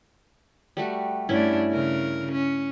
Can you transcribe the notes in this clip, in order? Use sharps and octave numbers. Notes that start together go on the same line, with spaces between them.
G3 A3 F#4
G2 A3 C#4 D4 E4
C#3 A#4
C#4